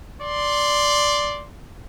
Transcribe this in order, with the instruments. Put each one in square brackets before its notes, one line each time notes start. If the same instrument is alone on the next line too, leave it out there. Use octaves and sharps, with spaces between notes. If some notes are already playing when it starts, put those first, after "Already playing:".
[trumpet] D5 [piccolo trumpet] C6